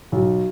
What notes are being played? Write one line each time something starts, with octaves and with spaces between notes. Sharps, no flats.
B1